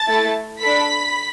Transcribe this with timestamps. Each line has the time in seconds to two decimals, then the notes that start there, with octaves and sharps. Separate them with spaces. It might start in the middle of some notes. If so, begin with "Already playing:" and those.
Already playing: A5 A6
0.08 A3 E4 A4
0.61 D4 A4 B5 B6